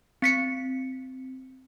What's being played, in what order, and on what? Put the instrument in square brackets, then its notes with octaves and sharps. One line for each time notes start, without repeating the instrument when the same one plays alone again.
[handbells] C4 B6 C#7